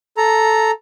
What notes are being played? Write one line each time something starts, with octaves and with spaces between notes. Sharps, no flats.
A4 A#5